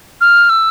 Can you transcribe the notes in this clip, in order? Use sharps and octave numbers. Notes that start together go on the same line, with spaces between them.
F6
E6